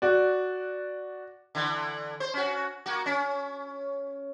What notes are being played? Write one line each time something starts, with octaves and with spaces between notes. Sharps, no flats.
F#4 D5
D3 E3
C5
C#4 F#4
A#3 F#4
C#4